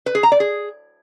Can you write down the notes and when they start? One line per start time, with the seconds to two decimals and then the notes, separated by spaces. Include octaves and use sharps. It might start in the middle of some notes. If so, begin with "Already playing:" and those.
0.06 B4
0.15 G#4
0.23 A#5
0.32 D5
0.40 G#4